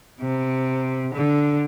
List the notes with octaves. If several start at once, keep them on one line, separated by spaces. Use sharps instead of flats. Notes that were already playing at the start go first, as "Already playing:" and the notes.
C3
D3